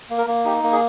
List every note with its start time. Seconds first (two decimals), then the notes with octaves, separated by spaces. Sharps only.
0.10 A#3
0.18 A#4
0.27 A#3
0.45 D#4 G4
0.64 A#3
0.72 G#4